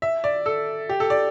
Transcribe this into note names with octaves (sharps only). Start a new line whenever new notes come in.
E5
D5
A4
G4
A4
D5